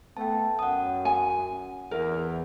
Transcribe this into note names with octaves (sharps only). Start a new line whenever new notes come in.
A3 B3 G5 A5
F#2 F#5 D#6
G#5
E2 A#4